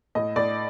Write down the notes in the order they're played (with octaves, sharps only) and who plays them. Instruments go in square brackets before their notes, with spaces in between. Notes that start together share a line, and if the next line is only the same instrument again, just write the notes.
[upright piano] A2 D#5
A2 D5